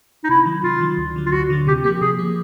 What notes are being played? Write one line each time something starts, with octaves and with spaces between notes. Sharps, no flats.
D#4
C3 E4
D#3 F#3
C3 F4
D#3 F#3
D2
D3 F#3
F4
D2 F#4
D3 F#3
C3 G4
F3 A#3 G4
C3 G#4
F3 A#3